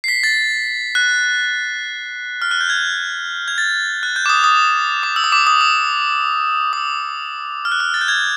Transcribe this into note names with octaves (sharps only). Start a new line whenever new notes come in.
C7
B6
A6
F#6
F6
F#6
G6
G#6
G#6
A6
F#6
G6
D6
D#6
D#6
D6
E6
D#6
D6
D#6
E6
D#6
E6
F6
F#6
F6
A6
G6
G#6